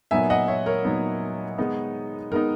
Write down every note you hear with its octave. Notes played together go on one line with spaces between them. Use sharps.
A#2 F#3 B3 D#4 E5 G#5
D#5 F#5
C#5 E5
A#4 C#5
A#2 F#3 B3 D#4
D#3 G#3 B3 D#4
D#3 G#3 B3 D#4 A#4